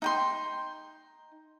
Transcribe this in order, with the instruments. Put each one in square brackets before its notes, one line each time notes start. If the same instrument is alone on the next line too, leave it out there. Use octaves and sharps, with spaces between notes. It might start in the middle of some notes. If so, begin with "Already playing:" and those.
[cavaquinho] D#4 G5 C6